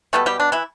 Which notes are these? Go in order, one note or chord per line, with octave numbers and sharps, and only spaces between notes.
B2 G3 A3 B3 A4
G3 G4
D4
E3 E4